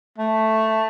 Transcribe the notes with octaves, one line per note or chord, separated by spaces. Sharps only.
A3